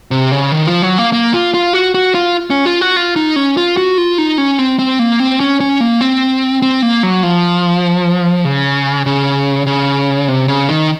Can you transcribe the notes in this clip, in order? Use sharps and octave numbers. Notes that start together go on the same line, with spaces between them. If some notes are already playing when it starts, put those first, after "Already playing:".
C3
C#3
D#3
F3
F#3
A#3
A#3
F4
F4
F#4
F#4
F4
C#4
F4
F#4
F4
D#4
C#4
F4
F#4
F4
D#4
C#4
C4
C4
A#3
C4
C#4
C#4
A#3
C4
C4
A#3
F#3
F3
C#3
C#3
C#3
C3
C#3
D#3